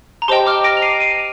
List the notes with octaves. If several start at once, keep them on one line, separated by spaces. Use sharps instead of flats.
A#5
G4 C5 D#5 G5 A5 C6
D6 F6
A#6 D7
F7
C7 D#7
C7 D#7